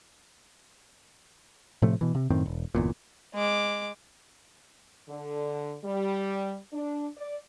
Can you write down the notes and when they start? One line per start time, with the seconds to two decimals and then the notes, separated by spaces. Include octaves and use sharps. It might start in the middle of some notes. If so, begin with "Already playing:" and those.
1.82 A2 C3 F3 A3
2.01 B2 E3
2.15 C3
2.30 F#2 A2 D#3 C4
2.46 E1
2.75 G1 E2 A#2
3.35 G#3 D6
5.09 D3
5.84 G3
6.73 D4
7.17 D5